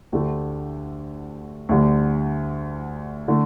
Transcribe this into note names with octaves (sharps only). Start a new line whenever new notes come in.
D2 D3 A3 G4
D2 D3 G3
D3 A3